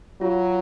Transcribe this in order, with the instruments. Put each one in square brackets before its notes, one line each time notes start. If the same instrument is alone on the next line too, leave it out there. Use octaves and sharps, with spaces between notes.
[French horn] F#3 [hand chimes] F4